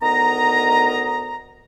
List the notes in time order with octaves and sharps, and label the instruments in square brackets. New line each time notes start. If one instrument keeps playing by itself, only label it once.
[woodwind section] D2 D#3 B3 D#5 A#5